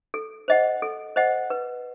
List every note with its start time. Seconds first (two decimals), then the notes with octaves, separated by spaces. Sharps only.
0.14 A4
0.48 C5 D#5 F#5
0.82 A4
1.16 C5 D#5 F#5
1.50 B4